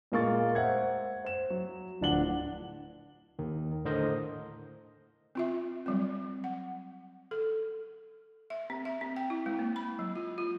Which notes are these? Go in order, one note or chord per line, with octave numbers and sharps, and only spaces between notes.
A#2 G#3 A#3 F4 C#6 A6
C5 E5 F#5 G#6
C5 E7
F#3
D1 F3 D4 F#5 F#7 G7
D#2 D#3
A2 D3 A#4 C5 D#5
C4 F4 E5
F#3 G3 C4
F#5
A4
E5
C4
E5
C4
G5
E4
G#3
A#3
B5
F#3
F4
F4